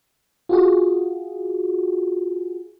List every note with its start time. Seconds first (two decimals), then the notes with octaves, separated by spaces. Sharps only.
0.49 F4 F#4 G#4